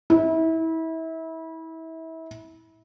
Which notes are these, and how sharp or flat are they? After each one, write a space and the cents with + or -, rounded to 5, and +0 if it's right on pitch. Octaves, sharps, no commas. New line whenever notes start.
E4 -30